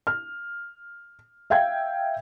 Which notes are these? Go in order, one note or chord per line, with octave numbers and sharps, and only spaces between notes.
F6
E5 F5 G5 G#6